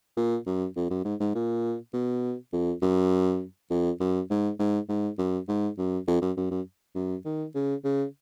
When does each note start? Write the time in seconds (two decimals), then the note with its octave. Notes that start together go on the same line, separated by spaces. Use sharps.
0.17 A#2
0.46 F#2
0.76 F2
0.90 F#2
1.05 G#2
1.20 G#2
1.35 A#2
1.94 B2
2.53 F2
2.82 F#2
3.71 F2
4.00 F#2
4.31 G#2
4.59 G#2
4.89 G#2
5.18 F#2
5.48 G#2
5.78 F#2
6.08 F2
6.22 F#2
6.37 F#2
6.51 F#2
6.95 F#2
7.25 D#3
7.55 C#3
7.84 C#3